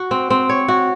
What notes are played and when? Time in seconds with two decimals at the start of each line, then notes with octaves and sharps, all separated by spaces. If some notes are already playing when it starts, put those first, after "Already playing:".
Already playing: F#4
0.11 C4
0.30 C4
0.49 C#5
0.68 F#4